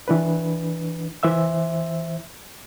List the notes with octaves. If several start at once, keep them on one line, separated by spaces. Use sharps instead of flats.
E3 D4 B4
E3 C5 E5 E6